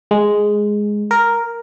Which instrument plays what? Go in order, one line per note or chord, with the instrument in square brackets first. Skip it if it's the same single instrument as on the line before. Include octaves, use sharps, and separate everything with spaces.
[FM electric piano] G#3
A#4